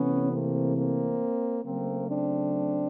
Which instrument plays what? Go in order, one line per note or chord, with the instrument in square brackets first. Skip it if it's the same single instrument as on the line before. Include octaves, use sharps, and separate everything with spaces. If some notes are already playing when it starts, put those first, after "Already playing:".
Already playing: [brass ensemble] C3 E3 A3 B3 C#4
A#3 C4
A#3 C4
C#3 F#3 A3 A#3 C4
C4 D4